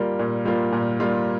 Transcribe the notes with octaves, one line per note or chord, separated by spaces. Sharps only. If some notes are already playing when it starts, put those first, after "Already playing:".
Already playing: G3 A#3 F4
A#2
G3 A#3 F4
A#2
G3 A#3 F4